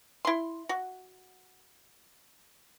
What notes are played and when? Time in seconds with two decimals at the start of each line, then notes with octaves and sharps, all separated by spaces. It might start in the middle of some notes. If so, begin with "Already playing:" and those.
0.25 E4 C6
0.69 F#4